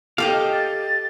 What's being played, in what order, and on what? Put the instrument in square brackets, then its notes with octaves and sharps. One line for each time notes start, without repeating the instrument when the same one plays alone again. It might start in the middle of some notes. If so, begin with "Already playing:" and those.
[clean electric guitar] G4 F5 [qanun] A4 [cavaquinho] D#5 G5 D6
[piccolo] A6